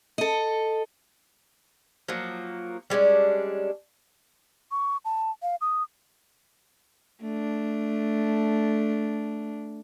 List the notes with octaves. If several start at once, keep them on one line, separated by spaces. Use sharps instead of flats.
A4 D#5
F3 F#3 A#3
G3 G#3 C#4 D4
C#6
A5
F5
D#6
A3 D4